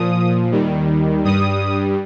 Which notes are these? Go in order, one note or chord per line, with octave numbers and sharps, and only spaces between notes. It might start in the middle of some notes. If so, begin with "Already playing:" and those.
Already playing: A#2 F3 D#6
D#2 D#3 G3
G2 G3 D#6